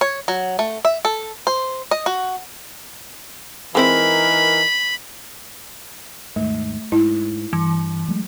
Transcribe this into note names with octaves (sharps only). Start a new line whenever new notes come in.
C#5
F#3
A3
E5
A4
C5
D#5
F#4
E3 G#3 C4 D#4 E4 A#4 B5
D#2 G#2 A3
G#2 E4
G2 E3
F#3 G#3 A3